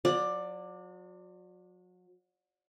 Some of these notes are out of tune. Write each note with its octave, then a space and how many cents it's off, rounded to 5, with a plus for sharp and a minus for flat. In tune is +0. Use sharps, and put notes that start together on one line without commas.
F#3 -35 D5 +10